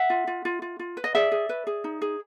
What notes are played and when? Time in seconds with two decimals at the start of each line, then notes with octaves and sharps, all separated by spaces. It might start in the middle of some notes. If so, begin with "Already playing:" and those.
Already playing: E5 F#5
0.10 F4
0.27 F4
0.45 F4
0.62 F4
0.79 F4
0.97 B4
1.04 D#5
1.15 G#4 D5 E5
1.32 G#4
1.49 B4
1.67 G#4
1.84 D#4
2.02 G#4